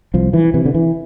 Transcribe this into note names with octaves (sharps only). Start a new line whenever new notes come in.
C2 F3
E3
C3 E3
D3
E3